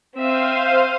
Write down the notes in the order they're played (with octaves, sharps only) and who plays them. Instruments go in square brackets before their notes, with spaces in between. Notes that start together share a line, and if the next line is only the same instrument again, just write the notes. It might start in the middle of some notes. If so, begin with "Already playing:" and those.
[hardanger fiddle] C4 E5 [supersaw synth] C5 F5 D#7